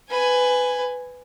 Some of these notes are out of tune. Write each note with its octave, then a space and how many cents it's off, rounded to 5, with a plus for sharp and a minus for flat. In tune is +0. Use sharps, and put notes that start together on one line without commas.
B4 +15 G#5 +0